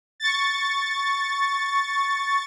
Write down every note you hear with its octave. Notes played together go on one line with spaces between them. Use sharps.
C#6 A6